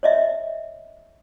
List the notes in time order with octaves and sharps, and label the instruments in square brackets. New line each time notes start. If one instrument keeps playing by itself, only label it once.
[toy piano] C#5 D#5 E5